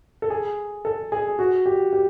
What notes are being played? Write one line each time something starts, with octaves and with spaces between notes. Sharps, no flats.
A4
G#4
A4
G#4
F#4
G4
G4